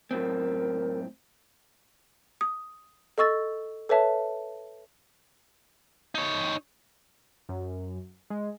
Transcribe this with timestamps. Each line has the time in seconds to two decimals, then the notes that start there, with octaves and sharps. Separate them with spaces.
0.11 F#2 A2 C4 A#4
2.41 D#6
3.18 A4 D#5 C#6 E6 A6
3.89 A4 B4 C#5 E5 A5
6.15 D#4 C#5
7.49 F#2
8.30 G#3